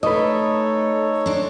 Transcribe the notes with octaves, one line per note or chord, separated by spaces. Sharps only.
A3 D#4 A4 B4 C#5 D#5
C4 D4